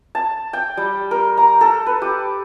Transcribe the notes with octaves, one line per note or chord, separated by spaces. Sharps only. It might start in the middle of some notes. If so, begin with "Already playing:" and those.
A5
G5
G3
A#4
A#5
A4
B4
G4